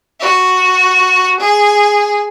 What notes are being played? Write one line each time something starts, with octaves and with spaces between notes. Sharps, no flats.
F#4
G#4